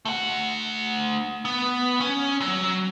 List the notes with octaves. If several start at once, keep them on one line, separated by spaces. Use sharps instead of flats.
A3 F#5
B3
C#4
F#3